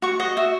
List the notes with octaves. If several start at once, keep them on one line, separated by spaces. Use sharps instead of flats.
F#4 C#6
F#4 D#5
F#4 E5